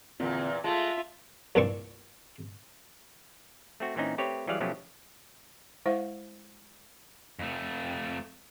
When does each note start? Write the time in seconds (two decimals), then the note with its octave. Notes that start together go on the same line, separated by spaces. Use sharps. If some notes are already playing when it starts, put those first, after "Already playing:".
0.20 E2 A#2 D3 C4 F4
0.64 G#3 A3 F4 E5 A5
1.55 C2 G2 A#2 C4 D5 C#6
3.80 A3 C4 F#4
3.95 A#2 E3 C4 C#4 D#4
4.18 A3 C4 G4 B4 C#5
4.47 E3 F#3 G3 G#4 D5 F5
4.60 B2 F3 F#3 A3 C#4 G4
5.86 G#3 E4 C5 E5 F5
7.39 F2 A3